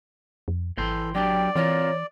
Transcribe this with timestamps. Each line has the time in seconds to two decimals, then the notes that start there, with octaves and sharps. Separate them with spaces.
0.48 F2
0.78 G#1 E3 A4 G5 C6
1.15 F#3 D4 G4 D5 G5
1.56 E3 C4 F4 A#4 C#5